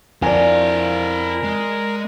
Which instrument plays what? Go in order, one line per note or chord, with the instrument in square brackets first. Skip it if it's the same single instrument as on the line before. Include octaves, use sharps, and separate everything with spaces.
[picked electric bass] F2 [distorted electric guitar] E4 F5 [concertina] A#4 [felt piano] D5 G#5
[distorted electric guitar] G#3